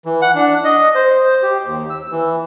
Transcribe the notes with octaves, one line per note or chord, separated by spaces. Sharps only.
E3
F#5
D4
D#5
C5
G4
D#2
E6
E3